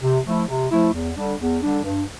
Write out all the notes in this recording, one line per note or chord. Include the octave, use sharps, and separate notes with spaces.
C3
F3 A3 E4
C3
F3 A3 E4
E2
D3 G3 D4
E2
D3 G3 D4
G2